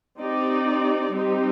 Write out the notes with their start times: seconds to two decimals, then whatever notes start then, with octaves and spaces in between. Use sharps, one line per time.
0.19 C4 D#4 G4 D5
1.14 G3 C4 D#4 G4